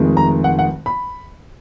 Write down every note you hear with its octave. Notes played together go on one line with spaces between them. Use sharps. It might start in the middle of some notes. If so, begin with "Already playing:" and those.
Already playing: F1 F2 D#3 G#3
A#5
F#5
F#5
B5